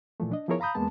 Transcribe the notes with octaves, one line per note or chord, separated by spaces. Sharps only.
A#2 E3 F3 A3
D4 D#5
F3 B3 E4 G#4 A#4 C#5
F5 A#5 B5 D#6 G6
E2 G#3 A#3 B3 A5